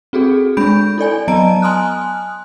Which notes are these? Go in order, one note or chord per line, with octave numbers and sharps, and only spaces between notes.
C4 F#4 G#4 A4
G#3 D4 B5 G6 D7
E4 A4 D5 G#5
F#3 B3 D#5 A5 A#5 D7
G#5 C6 D#6 F6 F#6